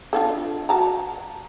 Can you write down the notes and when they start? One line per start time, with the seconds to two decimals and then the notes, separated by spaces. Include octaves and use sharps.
0.13 D4 F4 A4
0.69 F#4 A5 A#5